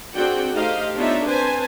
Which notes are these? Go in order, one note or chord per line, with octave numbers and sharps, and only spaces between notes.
C4 D4 F#4 G#4 F#5 G5
A3 D#4 G4 C5 D#5 F5
B3 D4 D#4 F4 C#5 E5
C4 B4 C5 G#5 A5